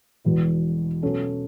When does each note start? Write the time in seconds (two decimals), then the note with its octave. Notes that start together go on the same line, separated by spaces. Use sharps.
0.25 E1 E2 B2
1.02 B2 F#3 C#4 A4